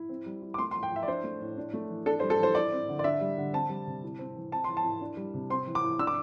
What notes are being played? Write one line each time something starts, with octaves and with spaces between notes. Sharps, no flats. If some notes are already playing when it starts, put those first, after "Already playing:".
Already playing: E4
C4
G3
E4
D6
A3 C6
C6
E3
G5
E4 E5
D5
D4 C5
A3
A2
D4
A3
E3
D4 A4
G3 C5
A4
E3 C5
E4 D5
C4
D3
D5
D4 E5
G3
D3
C4 A5
G3
C3
E4
C4
E3
C4 A5
E3 C6
A5
E4
D4
G3
C3
C4 C6
E3
D6
E4
D4 E6
D6